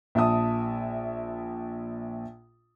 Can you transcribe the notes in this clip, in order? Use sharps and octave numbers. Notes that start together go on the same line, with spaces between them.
A#1 E5 A5 D#6